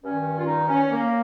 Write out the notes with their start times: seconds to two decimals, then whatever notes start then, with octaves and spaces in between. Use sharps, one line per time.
0.03 G2 D#3 C#4
0.39 F4
0.46 D#4
0.68 C#4
0.90 A#3